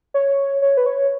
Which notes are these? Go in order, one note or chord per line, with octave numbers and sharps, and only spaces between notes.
C#5
C#5
B4
C#5